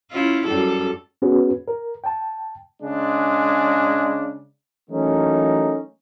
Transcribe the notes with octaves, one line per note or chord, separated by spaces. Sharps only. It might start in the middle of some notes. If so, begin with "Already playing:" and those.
C#4 E4 F4
F#2 G3 A4
B3 C#4 F#4 G#4 B4
A#4
G5 A5
C#3 G#3 D4
E3 F#3 A3 A#3 C#4 D#4